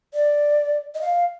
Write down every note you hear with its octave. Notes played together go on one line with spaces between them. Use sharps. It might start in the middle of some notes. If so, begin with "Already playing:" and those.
D5
D#5
F5